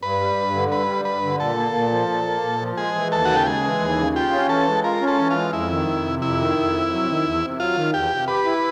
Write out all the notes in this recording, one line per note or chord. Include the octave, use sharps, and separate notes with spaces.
G2 B4
G3
G2
D3
G2 B4
G3
G2 B4
D3
A#2 A4
A#3
A#2
F3
A#2
A#3
A#2
F3
G#3 G#4
E3
D#2 A4
C#3 F#4
G4
G#3 G#4
E3
D#2
C#3
F4 G4
C#4
E3 A4
G#3
F4 A#4
C#4
A4
E3
G#3 F4
F2 E4
D#3
F2
C3
F2 E4
D#3
F2
C3
F#3
D#3
E2
C3
F#3 F4
D#3
E2 G4
C3
G4 B4
E4